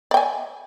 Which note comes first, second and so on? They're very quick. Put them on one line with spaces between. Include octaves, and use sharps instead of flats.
D5 G5 G#5